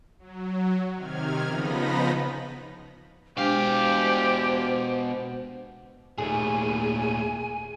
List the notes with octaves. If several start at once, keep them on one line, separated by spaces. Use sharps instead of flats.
F#3
C3 D#3 F6 G#6
C#3 F3 B3 D#4 B5 A#6
B2 G#3 D4 G4 C5 F5
D#2 A#2 A3 G#4 G#5